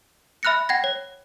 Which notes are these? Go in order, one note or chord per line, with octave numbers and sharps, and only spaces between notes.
E5 B5 F6 F#6 A#6 C#7
F#5 G5 G#6 A#6
C#5